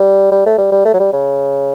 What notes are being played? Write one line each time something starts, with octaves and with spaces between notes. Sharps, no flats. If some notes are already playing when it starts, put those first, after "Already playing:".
Already playing: G3
G3
A3
G3
G3
A3
F#3
G3
C#3